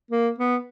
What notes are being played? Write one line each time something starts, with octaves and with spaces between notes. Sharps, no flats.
A#3
B3